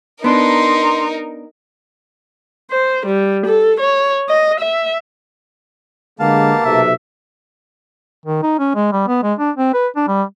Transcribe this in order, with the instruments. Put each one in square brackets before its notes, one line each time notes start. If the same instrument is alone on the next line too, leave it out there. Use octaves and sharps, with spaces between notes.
[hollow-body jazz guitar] B3 D4 [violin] D#4 A#4 [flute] C6
[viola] C5
G3
A4
C#5
D#5
E5
[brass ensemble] D3 G#3 [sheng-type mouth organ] A#3 A5 [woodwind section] B3 G4 F5
[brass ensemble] B1 [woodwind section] C3 [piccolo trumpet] E5
[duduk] D#3
D#4
C#4
G#3
G3
B3
G#3
D4
C4
B4
D4
G3